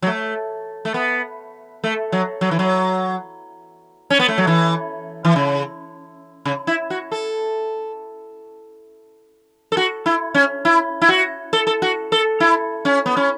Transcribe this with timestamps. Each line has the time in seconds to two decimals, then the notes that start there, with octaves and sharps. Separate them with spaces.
0.02 F#3
0.07 A3
0.85 A3
0.94 B3
1.84 A3
2.12 F#3
2.41 F#3
2.51 E3
2.59 F#3
4.10 C#4
4.19 B3
4.28 A3
4.38 F#3
4.47 E3
5.25 E3
5.36 C#3
6.45 C#3
6.67 E4
6.90 F#4
7.12 A4
9.72 A4
9.77 F#4
10.06 E4
10.35 C#4
10.65 E4
11.02 E4
11.09 F#4
11.53 A4
11.67 A4
11.82 F#4
12.12 A4
12.40 E4
12.85 C#4
13.06 B3
13.17 C#4